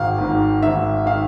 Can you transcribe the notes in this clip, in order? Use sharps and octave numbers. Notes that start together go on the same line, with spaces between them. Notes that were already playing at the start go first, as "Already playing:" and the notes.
Already playing: G#1 G#2 D#3 F5
G#1 G#2 D#3
G#1 G#2 D#3 E5
D#3 F5